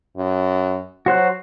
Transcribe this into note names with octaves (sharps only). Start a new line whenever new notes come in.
F#2
F#3 F#4 C5 F#6